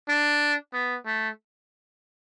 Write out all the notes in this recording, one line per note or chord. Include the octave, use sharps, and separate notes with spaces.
D4
B3
A3